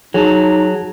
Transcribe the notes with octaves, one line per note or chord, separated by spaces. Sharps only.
F#3 D#4 G#4 A5